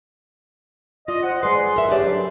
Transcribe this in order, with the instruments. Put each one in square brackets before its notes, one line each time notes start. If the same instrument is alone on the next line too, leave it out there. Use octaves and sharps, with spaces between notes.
[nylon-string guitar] F4 [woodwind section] D5 D#5
[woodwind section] C5 F#5
[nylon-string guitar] G#3 B4 [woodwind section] G#4 D5 C6
[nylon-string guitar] A#4 E5
[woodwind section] C#4 D4 G4 [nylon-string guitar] B4 D5
[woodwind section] D2 G2 F#3